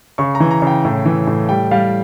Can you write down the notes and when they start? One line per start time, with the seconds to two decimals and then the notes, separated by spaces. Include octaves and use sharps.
0.18 C#3 C#6
0.35 A#5
0.40 E3
0.51 A#5
0.62 C#3 G5
0.85 A2
1.05 E3
1.27 A2
1.49 G3 G5
1.71 G3 F5